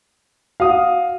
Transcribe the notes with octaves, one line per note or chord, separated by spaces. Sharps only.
F#4 F5 D#6